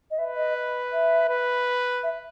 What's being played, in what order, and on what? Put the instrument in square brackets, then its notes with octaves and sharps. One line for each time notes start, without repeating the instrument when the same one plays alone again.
[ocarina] D#5
[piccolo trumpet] B4 [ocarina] E5
[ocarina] D#5
E5
[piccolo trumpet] B4
[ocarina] E5